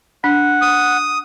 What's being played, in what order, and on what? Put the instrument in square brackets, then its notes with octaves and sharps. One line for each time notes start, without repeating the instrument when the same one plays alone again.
[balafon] D4 [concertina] F#5
[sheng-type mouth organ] D#6